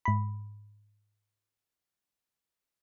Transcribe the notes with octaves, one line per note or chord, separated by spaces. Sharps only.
G#2 B5